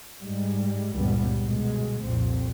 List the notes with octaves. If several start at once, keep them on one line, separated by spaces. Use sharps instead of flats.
G#2 G3 G#3
C#2 G2 A#2 E3 G3 B3
G1 B2 G#3
C2 F2 A#2 C4